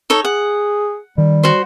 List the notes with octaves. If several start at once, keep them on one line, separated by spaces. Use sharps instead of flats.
D#4 A4 C#5
G#4 F#5
D#3 G3
F#4 C5